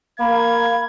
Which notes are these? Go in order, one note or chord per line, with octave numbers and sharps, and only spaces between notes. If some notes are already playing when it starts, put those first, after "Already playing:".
A#3 F5 B5 G#6